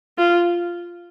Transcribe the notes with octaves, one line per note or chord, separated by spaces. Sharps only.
F4